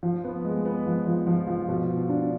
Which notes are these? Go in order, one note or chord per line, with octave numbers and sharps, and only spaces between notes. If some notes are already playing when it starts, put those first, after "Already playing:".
F3
B3
G#3
B3
F3
F3
F3
F3
B2
F4
D4